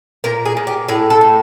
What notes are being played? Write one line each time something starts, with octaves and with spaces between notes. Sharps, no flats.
A#2 A#4
G#4
A#2
G4
A2 G#4
A4
A2